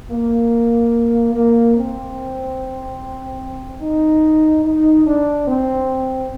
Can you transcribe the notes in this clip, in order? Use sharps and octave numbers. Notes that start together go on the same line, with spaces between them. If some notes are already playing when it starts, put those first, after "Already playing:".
A#3
A#3
C4
D#4
D#4
D4
C4